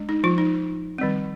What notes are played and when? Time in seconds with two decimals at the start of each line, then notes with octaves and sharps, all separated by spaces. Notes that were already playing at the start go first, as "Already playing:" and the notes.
Already playing: G#3 D4
0.09 D#4
0.24 F3 F4
0.38 D#4
0.98 D#3 G3 C4